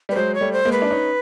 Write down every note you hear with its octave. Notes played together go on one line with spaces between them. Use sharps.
G3 B4
F#3 G#3 C5
C#5
G3 A3
C5
G#3 A#3
B4
D4
C#4 D#4